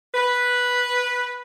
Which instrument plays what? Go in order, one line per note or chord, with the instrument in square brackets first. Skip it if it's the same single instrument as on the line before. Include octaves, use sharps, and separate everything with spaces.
[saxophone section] B4